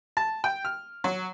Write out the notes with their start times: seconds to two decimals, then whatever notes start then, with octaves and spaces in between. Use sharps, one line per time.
0.17 A5
0.44 G5
0.65 F6
1.04 F#3